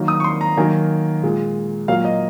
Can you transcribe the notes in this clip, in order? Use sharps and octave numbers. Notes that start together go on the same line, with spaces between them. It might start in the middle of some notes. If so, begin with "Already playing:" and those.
Already playing: D#3 F#3 A#3
D#6
C#6
C6
A#5
D#3 F#3 A#3 G#5
A#2 G#3
A#2 F#3 A#3 F5
D#5